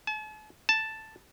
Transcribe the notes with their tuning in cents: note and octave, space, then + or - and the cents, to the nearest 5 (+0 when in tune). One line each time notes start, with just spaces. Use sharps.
A5 -45
A5 +0